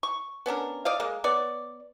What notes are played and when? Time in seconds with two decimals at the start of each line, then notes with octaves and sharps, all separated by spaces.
0.03 C#6
0.46 B3 C#4 D4 A#4
0.85 D5 D#5 F5
1.00 G#3 A#3
1.24 B3 C#5 D5